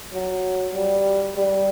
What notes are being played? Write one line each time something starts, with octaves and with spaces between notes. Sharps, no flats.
F#3
G3
G3